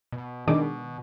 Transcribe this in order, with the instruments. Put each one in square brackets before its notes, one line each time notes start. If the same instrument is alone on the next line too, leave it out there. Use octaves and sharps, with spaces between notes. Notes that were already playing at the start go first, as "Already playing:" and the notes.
[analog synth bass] B2
[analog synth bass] B2 [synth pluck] D#3 [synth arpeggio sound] G#3 D4 D6